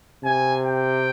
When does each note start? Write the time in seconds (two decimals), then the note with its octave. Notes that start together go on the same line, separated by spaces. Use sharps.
0.23 C3 G#5
0.66 G5